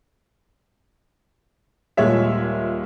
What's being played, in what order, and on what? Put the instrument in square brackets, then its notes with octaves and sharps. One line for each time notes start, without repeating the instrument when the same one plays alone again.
[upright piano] D#1 A#2 G#3 C#5 E5